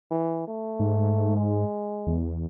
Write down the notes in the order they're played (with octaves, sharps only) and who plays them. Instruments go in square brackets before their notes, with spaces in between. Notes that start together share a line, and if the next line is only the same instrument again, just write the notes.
[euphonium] E3
A3
[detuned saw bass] G#2
[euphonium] G#3
[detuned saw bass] E2